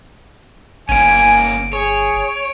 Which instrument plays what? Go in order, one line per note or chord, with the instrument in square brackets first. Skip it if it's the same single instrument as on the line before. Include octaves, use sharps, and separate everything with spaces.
[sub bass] G1 [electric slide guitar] A#3 C#4 [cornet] G#5 [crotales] D7 D#7
[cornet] G#4 [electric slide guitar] C#5